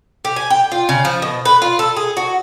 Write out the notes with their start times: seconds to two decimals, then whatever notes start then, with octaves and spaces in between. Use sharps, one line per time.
0.25 G4
0.36 G#5
0.50 G5
0.72 F4
0.89 C#3
1.05 F3
1.22 B2
1.45 B4
1.62 F4
1.79 A4
1.97 G#4
2.17 F#4